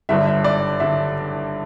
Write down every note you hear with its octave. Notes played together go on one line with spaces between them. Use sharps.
G1 G2 D3 E5
E5
D5
D3 E5